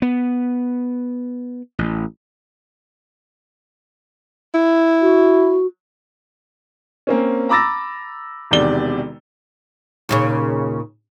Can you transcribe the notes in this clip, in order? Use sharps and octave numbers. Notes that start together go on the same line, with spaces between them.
B3
A1
E4
F#4
A#3 C4 C#4
A#5 B5 D6 E6 A6 A#6
E1 E2 C3 D#3 D5 G7
D#2 A#2 C#3